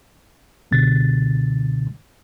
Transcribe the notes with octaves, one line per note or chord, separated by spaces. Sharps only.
C#2 B2 D3 A6